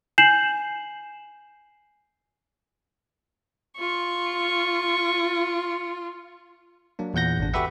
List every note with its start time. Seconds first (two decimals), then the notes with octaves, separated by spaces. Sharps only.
0.18 G#5 G6 C7 E7 F#7
3.80 F4 C#6
6.99 F#3 A#3 D4
7.14 E2 A#2 F#5 G6 A#6
7.39 G#1 D4
7.54 F#4 G4 A4 B4 E5 F#5